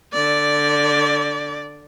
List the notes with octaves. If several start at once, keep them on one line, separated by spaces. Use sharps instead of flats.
D3 D5